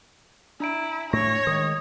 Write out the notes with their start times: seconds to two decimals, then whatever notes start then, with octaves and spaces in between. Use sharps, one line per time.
0.60 D4 E4 A#5 D7
1.13 A2 A3 D4 C#5 C#6 A#6
1.47 D#3 G#3 D#6